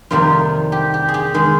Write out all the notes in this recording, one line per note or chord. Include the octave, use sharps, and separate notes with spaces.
F2 C3 D#3 G3 A#3 F4
G4
G4
G#4
G4
D#3 G#3